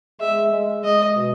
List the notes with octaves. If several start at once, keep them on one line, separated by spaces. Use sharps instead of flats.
G#3 E5
G#3
G#3 D#5
B2